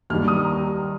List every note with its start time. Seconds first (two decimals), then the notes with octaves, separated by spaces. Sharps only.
0.10 D#2 D#3 G3 F6
0.28 D#6
0.45 A#5